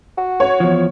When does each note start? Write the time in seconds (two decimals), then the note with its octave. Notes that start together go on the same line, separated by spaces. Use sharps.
0.18 F#4
0.40 C#5
0.60 E2 F3